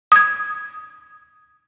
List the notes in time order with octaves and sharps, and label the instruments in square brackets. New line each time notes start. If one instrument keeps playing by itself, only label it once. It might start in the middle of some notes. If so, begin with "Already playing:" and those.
[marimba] D#6 G#6